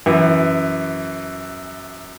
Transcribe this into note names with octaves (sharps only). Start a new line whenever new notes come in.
F#2 E3